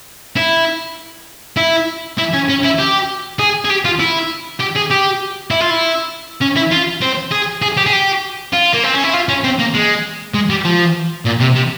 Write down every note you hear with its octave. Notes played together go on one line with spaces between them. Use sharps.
E4
E4
E4
C#4
C#4
E4
G4
G#4
G#4
G4
F4
E4
G4
G#4
G4
E4
F4
E4
C#4
E4
F4
C4
G#4
G#4
G4
G#4
G4
F4
A#3
C4
C#4
E4
F4
C#4
C4
A#3
G#3
G#3
G3
F3
A#2
C3
C3